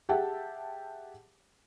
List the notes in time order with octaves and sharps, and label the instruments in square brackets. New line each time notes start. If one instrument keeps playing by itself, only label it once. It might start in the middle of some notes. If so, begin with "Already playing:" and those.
[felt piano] G4 G#4 E5 F#5 G5 A5